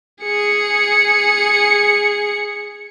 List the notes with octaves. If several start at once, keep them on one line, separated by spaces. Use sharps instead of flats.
G#4 C#7